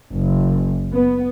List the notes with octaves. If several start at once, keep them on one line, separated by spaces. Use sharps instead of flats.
F#1
B3